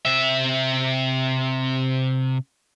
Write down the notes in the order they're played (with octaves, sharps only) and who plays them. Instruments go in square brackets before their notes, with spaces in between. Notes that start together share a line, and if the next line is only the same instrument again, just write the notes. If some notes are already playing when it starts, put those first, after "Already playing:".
[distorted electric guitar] C3 E5